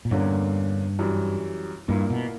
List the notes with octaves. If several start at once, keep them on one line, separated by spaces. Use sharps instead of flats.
A#2
E2 G2 D3 A#3 C#4
F#2 E3 G3
G2 A#2 A#3 E4
B2